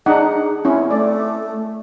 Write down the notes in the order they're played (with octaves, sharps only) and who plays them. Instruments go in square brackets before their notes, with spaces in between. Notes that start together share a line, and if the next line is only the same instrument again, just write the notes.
[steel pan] D4 D#4 F#5 [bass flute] G#4
[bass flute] C4 [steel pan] C#4 E4
[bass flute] A3 [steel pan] D5